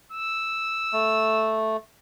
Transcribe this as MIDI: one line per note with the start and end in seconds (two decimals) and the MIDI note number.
0.12 1.60 88
0.93 1.77 57